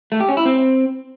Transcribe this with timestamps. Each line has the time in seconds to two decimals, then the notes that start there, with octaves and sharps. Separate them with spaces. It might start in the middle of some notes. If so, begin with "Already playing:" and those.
0.12 A3
0.20 G4
0.29 C#4
0.37 E4
0.45 C4